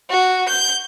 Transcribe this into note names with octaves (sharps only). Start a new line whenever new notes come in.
F#4
G6